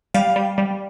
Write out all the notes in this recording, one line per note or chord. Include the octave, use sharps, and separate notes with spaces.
G3 F5
G3
G3